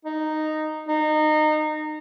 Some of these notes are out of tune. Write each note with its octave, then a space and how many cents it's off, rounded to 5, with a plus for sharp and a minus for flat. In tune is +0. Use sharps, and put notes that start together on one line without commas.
D#4 -5
D#4 -25